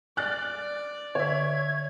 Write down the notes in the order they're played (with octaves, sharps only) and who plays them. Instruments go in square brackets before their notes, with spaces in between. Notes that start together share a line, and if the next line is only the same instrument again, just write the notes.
[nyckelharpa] D5 [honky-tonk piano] F6 F#6 A6
[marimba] D3 [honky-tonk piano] C#5 E5 [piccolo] G#6